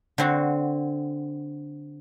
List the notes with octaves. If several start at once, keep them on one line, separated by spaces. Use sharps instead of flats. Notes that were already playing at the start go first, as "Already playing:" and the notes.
D3 C4 F#4